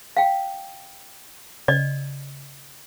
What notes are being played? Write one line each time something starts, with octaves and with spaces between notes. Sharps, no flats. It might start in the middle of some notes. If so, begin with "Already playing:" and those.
F5 G5
C#3 D5 D#5